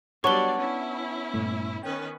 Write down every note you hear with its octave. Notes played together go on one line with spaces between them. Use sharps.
F#3 G3 B3 D4 C#5 D5 C#6 G7
C#4 E4
G2 A#2 A3
D#3 C#4 B4 G5